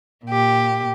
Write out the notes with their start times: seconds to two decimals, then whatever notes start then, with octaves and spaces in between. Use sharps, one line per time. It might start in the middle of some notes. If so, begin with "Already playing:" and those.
0.25 A#2 G4